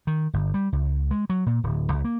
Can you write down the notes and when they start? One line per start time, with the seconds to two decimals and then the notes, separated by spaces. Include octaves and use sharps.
0.07 D#3
0.33 G1
0.54 G3
0.72 C#2
1.11 G#3
1.30 F#3
1.46 A#2
1.63 D1
1.92 C#2
2.05 A#3